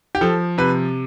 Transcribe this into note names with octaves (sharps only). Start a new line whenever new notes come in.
G4
F3 A4
C3 B4